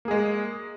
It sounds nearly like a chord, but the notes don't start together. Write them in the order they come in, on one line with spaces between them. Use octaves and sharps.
A#3 G#4 G#3